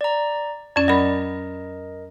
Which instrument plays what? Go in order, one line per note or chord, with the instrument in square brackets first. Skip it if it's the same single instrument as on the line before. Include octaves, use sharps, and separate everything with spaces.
[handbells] D5 A#5
[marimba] F2 C#4 [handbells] D5
[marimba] F#3 B5 [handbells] A#4 D#5